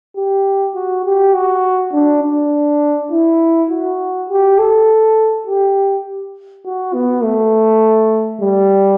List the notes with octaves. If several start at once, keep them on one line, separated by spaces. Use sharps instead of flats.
G4
F#4
G4
F#4
D4
D4
E4
F#4
G4
A4
G4
F#4
B3
A3
G3